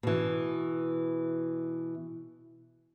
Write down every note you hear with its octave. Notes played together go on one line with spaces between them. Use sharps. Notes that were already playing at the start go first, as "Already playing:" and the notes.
B2 E3